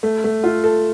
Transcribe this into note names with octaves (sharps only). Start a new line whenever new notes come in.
A3
A3
F4
A4